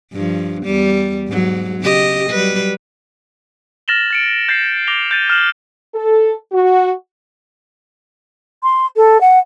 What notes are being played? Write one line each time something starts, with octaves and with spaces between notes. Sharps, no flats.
G2 F3
E2 G3
G#2 F#3
C#3 G4 D#5
F#3 G3 B4
F6 A6 A#6 E7 F#7 G7
A6 C#7 D7
G6 A6 A#6 C7
D6 A#6 F7 G7
G6 A6 D#7
F6 E7 F#7
A4
F#4
C6
A4
F#5